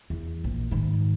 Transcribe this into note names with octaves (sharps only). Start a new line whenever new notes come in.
E2
A#1
G#2 D#3